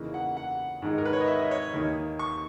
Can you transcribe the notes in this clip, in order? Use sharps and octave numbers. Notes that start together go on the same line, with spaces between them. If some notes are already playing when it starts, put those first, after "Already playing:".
Already playing: E2 C#3 E3 A#3 D#4
F#5
F#5
G#2 D#3 G#3 D#4
A#4
B4
C#5
D#5
E5
D#5
C#5
D#2 D#3 A#3 D#4
C#6